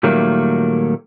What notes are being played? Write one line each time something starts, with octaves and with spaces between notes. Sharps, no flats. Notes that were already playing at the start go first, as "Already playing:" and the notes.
A#2 D#3 F#3 G3 A3 A#3